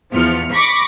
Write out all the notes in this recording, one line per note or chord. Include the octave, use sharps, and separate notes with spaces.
E2 F3 F6 C#7
B5 C#6 D6 A#6 C#7